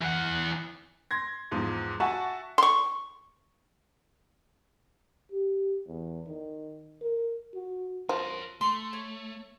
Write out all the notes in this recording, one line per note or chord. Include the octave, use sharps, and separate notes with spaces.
E3 F#5
C6 G#6 A#6
E2 G#2 F3
F#4 E5 F#5 G#5 A5 C#6
C6 C#6
G4
E2
D#3
A#4
F#4
F3 A#4 C#5
A3 C6
C#5